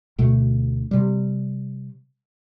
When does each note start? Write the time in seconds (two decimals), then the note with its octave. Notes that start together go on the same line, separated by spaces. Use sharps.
0.18 D2 B2 A3
0.91 C3 G3